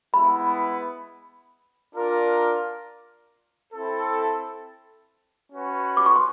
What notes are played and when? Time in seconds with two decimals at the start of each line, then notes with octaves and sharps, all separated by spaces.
0.14 G#3 B3 E4 B5
1.93 D4 F4 A#4 D5
3.73 C4 E4 A4
5.52 C#4 F#4 B4
5.97 D6
6.06 C#6
6.16 C6